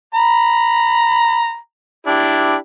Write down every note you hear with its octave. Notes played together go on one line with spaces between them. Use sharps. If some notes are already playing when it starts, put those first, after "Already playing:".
A#5 B5
D4 E4 G4